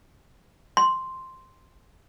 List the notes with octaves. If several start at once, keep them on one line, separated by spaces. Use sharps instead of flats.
C6